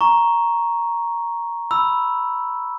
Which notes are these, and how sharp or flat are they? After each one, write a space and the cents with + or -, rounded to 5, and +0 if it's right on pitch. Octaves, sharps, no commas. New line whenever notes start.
A#5 +5 C#6 +0
B5 +0 E6 +0